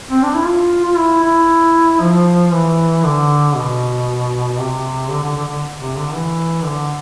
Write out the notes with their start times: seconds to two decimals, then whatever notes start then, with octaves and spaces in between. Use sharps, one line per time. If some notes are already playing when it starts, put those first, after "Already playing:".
0.10 C4
0.23 D4
0.34 E4
0.45 F4
0.85 F4
0.97 E4
1.23 E4
2.01 F3
2.52 E3
3.04 D3
3.55 B2
4.59 C3
5.10 D3
5.23 D3
5.36 D3
5.48 D3
5.78 C3
5.97 D3
6.14 E3
6.64 D3